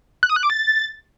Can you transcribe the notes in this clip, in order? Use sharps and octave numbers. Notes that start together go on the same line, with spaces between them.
F#6
D#6
F#6
D6
A6